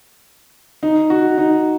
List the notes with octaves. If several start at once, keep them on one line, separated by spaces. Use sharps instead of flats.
D#4
F#4
D#4